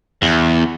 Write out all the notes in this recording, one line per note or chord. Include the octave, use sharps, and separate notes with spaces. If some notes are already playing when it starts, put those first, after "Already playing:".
E2